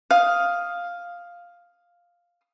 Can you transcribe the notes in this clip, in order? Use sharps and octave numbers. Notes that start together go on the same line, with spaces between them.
F5 D#6